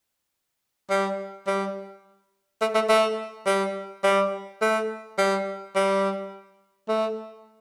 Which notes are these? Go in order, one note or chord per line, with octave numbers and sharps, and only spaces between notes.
G3
G3
A3
A3
A3
G3
G3
A3
G3
G3
A3